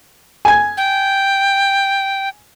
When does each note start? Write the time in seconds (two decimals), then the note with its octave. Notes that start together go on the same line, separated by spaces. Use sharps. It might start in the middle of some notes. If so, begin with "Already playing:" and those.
0.45 G#5 G#6
0.77 G5